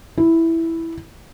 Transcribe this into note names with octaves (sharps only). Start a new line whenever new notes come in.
E4